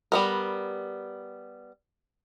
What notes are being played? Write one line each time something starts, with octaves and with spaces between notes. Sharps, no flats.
G3 B3 A#4